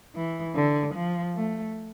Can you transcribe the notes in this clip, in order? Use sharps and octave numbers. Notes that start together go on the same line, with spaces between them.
E3
D3
F3
A3